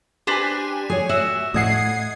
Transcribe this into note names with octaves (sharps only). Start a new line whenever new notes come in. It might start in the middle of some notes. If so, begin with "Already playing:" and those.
D4 G4 B4 C5 G#5
G#4 C#5
F#4 E5
A2 D#5 F#5 D#6 G#6 C7